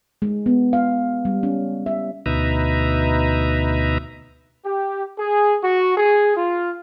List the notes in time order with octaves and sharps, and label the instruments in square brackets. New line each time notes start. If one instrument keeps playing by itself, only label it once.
[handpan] G#3
B3
F5
G3
C#4
E5
[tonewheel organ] D2 B2 D#4 B4 E5 A#5
[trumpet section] G4
G#4
F#4
G#4
F4